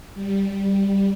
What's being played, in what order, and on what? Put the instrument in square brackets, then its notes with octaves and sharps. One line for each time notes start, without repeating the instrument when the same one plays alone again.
[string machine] G3